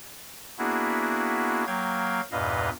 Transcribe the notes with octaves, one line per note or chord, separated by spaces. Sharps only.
A#3 B3 D4 E4 F#4 G#4
F#3 A#3 F5 G5 G#6
E2 G2 A#2 B4 D#5 F5